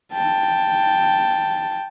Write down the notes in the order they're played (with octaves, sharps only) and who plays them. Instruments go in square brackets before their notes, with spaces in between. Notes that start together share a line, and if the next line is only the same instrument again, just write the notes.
[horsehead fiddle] G5 A5